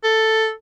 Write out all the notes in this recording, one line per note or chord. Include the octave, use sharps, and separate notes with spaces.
A4